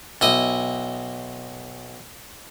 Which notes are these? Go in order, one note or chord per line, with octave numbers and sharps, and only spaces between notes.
B1 E4 D#5